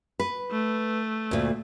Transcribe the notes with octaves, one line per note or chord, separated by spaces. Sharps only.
B4
A3
D2 A#2